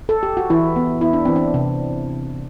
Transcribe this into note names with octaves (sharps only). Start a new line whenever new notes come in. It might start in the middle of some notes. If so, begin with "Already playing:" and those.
A4
G4
F#4
E3 E4
B3
B3 E4
D4
E3 C4
D4
C3